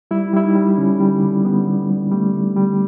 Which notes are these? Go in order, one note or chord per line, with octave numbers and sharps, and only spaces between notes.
G3 E4
G3 E4
D#4
G3
D3 C#4
G3
D3
G3 B3
G3
G3
G3 A3
D3
G3